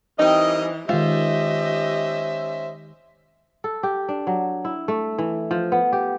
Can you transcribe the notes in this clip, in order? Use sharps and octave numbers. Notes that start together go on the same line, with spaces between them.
E3 G3 C4 D#4 A#4 D#5
D#3 G#3 C#4 F4 G4 C5 D#5 E5
A4
G4
D4
F#3
E4
A3
E3
F3
B3
G4